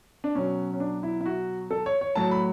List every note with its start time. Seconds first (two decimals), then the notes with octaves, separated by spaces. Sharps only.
0.24 D4
0.35 B2 F#3 C#4
0.74 C#4
0.80 D4
1.03 E4
1.21 E4
1.26 F#4
1.71 A4
1.86 C#5
2.01 C#5
2.15 A2 F#3 A5
2.31 B5